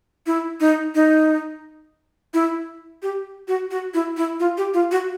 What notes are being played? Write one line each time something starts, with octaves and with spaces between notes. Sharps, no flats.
E4
D#4
D#4
E4
G4
F#4
F#4
E4
E4
F4
G4
F4
F#4